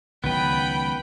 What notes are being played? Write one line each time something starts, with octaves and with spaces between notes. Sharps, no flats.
C#2 D#3 F#3 B3 B4 G5 B5